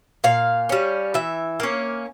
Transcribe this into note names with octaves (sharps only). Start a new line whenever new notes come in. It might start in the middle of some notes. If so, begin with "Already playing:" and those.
A#2 F5
G3 C#4
E3 E5
A#3 C#4